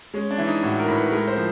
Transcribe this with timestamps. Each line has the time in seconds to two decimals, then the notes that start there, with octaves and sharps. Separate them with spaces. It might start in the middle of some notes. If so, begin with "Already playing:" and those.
0.14 G#3 C#4
0.31 D4
0.38 E3
0.47 D#4
0.63 A2 F#4
0.79 A#4
0.88 A2
0.95 B4
1.12 G#3 A#4
1.28 C5
1.36 F3